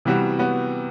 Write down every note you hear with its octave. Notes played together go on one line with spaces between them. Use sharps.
C3 E3 G3 B3 F#4
B3 F#4